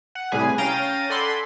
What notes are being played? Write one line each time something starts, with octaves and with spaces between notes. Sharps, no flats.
F#5
A2 C3 G3 G#4 B4 G#5
C#4 F5 G5 A#5 A6 D#7
A4 D5 F#5 G#5 B5 C6